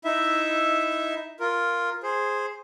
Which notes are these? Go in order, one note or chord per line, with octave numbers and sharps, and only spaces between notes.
D#4 E4 E5
F4 A#4
G#4 C5